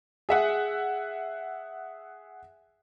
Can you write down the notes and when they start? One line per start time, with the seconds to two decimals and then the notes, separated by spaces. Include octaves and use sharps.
0.29 G#4 E5 F#5